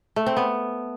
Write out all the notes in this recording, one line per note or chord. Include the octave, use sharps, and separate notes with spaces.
A3
C4
B3